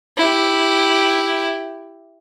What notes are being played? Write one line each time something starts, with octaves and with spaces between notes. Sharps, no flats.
E4 G4